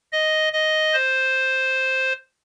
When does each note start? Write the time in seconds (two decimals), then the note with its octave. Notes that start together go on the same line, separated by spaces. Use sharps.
0.12 D#5
0.53 D#5
0.93 C5